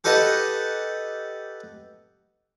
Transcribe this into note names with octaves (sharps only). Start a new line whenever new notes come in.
G4 A4 B4 D#5 F#5 A5